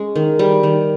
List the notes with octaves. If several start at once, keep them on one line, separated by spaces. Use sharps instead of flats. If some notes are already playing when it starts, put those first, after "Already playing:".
Already playing: G#3 C#4
D#3
G3
D#3